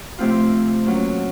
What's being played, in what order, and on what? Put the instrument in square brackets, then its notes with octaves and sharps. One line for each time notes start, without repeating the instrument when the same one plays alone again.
[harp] C3 F3 A3 C4 F4
F#3 A#3 C#4